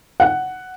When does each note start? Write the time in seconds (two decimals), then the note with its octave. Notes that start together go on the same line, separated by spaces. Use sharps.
0.20 F#5